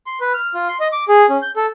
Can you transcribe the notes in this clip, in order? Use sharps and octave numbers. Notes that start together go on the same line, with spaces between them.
C6
B4
F6
F4
C6
D#5
D6
G#4
C#4
G6
A4